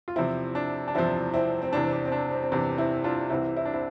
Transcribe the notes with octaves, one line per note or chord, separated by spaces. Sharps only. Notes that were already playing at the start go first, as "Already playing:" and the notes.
F4
E2 C3 F3 C4 E4
D4
D4
E2 C3 F3 C4 E4
C4 E4
C4
E2 C3 E3 D4
C4
D4
C4
D4
C4
C4
E2 C3 E3 D4
C4 E4
D4 F4
C2 C3 E3 C4 E4
E4
D4
C4 E4